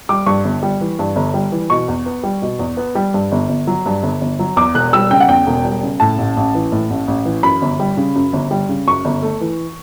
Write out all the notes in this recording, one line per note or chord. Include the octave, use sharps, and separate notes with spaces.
G3 D6
G2 C#6
G1
G3
E3
G2
G1
G3
E3
B2 C#6
E2
B3
G3
B2
E2
B3
G3
G2
G1
G1
F#3
G2
G1
G1
F#3
E2 D6
E1 F#6
G3 E6
C#3 G5
F#5
E2 G5
E1
G3
C#3
A2 A5
A1
A1
E3
A2
A1
A1
E3
F#2 B5
G1
G3
C#3
F#2
G1
G3
C#3
F#2 C#6
G1
A3
E3